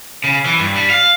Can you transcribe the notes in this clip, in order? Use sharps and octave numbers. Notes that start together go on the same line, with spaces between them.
C#3
E3
G2
G3
F5